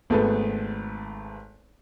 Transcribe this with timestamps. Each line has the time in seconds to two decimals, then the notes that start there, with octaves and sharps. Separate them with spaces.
0.10 G#1 A3 B3 G#4 A4 B4